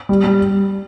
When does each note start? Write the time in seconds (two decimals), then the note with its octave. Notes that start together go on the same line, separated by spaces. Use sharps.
0.09 G3
0.24 G3